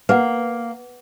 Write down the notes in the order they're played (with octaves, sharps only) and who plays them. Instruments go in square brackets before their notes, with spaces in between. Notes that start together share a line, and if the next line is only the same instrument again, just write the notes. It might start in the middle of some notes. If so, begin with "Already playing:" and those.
[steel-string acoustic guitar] A#3 [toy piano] B4 F#5